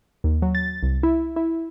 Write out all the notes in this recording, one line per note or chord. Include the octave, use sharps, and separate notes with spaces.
D#2
F#3
A6
C2
E4
E4